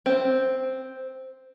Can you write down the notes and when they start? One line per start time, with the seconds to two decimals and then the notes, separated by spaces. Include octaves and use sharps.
0.06 C4